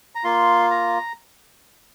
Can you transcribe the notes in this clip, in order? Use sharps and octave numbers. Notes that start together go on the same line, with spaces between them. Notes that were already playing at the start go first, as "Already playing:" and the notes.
A#5
A#3 F4 C6
A#5